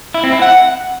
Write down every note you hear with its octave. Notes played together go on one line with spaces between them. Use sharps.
E4
C4
E4
F#5